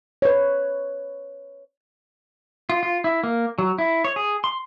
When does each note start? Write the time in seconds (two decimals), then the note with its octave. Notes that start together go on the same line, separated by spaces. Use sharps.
0.22 B4 C#5
2.70 F4
2.83 F4
3.04 E4
3.23 A#3
3.59 F#3
3.78 E4
4.04 C#5
4.16 G#4
4.44 C6